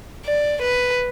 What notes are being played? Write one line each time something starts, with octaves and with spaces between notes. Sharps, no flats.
D5
B4